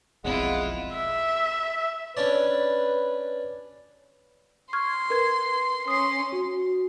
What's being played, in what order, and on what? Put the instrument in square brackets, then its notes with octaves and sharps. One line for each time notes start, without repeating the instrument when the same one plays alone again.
[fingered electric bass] F1 B1 C4 [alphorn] G#3 [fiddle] E4 F4 [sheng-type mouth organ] F#5
[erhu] E5
[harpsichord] C#4 D4 D5 [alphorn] B4
[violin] C6 [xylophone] C#6 F6 G#6
[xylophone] A#4 B4 G#6
[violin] C#4 C6 [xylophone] D#6 C7
[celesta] F#4